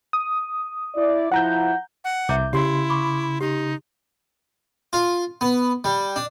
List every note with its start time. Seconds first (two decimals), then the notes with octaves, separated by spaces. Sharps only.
0.13 D#6
0.95 E4 D5
1.32 F3 E4 F#5 A#5 G6
2.04 F#5
2.29 C2 E5 A#5 D6 G6
2.53 C#3 E4 G4 C6
2.90 B5 C#6 D6
3.41 D#4 G4
4.93 F4
5.41 B3
5.84 G3
6.16 D4